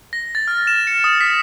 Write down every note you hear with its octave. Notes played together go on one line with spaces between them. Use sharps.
A#6
A6
F6
E7
C#7
D#6
B6